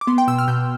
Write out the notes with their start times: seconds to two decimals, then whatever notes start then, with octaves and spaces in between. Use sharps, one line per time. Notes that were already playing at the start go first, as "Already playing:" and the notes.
0.01 D6
0.07 B3 C6
0.18 G5
0.28 B2 E6
0.38 F6
0.48 B2 G6